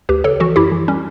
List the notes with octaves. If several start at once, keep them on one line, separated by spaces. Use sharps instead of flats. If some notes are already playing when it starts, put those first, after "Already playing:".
D2 G4 B4
C#3 A4 C#5
E3 F#4 A4
F#2 E4 G4
E3
G3 C#4